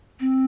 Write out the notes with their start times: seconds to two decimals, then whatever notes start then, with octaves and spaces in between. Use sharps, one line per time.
0.20 C4